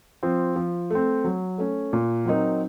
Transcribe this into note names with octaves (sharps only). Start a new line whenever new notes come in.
F3 C4
F3
A3 C4
F#3
A3 C#4
A#2
F#3 C4 D#4 A#4